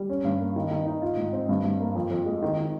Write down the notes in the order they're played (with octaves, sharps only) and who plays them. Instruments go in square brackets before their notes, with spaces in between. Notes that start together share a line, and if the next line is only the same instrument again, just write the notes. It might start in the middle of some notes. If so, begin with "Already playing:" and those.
Already playing: [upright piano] G3
C#4
G2
A#3
D#3
D#3
D#4
F4
G#2
C4
G2
G2
A#3
F2
F2
G#3
D#3
D#3